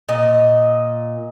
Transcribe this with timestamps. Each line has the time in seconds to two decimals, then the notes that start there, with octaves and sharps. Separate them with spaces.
0.09 A#2 D#5